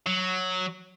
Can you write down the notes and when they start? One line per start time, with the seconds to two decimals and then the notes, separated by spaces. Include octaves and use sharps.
0.07 F#3